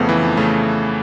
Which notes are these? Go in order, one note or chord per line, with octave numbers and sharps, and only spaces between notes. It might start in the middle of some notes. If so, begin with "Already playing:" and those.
Already playing: F2 C#3 A3 B3
E3
F2
C#3 A3